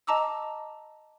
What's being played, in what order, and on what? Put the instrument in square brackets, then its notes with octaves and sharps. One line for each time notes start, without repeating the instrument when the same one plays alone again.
[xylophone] D#5 A5 A#5 D6 E6